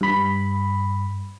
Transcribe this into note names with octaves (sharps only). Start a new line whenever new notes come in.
G2 B5